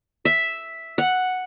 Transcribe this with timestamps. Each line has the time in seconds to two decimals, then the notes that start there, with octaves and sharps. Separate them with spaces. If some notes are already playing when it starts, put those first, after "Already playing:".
0.25 E5
0.98 F#5